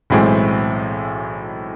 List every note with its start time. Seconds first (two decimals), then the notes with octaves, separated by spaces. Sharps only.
0.10 B1 A2 E3 G#3 C4